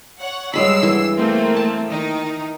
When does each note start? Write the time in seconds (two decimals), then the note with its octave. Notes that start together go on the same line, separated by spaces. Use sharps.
0.19 C#5 F#5
0.54 G2 F#3 G#3 B5 E6 C7
0.83 E3
1.17 A3 A#3 C4
1.57 A5
1.88 D#3 D#4